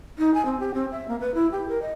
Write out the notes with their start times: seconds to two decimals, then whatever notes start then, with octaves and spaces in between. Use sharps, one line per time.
0.18 D#4
0.34 G#5
0.45 C4
0.60 G4
0.74 C4
0.91 E5
1.08 A#3
1.21 B4
1.34 E4
1.52 G4
1.69 A#4
1.82 D#5